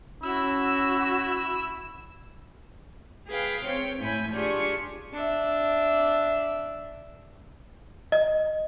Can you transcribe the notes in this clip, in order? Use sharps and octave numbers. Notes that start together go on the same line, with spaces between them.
C#4 E4 F#4 E6
G#4 B4 F5 G5
C4 C#5 G5
A2 E4 G#5 B5 G6
D4 F4 G4 G#4 C#6
D4 E5
D#5